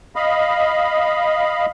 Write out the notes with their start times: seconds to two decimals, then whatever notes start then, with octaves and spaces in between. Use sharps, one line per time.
0.16 D#5 F5 B5